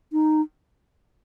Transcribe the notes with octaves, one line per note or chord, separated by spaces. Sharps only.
D#4